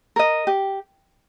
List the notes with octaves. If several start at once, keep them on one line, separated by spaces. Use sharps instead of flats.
A#4 D#5
G4